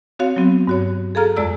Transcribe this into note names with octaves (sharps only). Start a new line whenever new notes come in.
C4 F#4 C#5 F5
F#3 B3 C4
G2 F#4 C#5
G#4 A4 F5 A#5 F6
F2 G#3 D5 E6